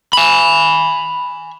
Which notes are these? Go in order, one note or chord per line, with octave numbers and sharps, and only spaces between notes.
G#5 B5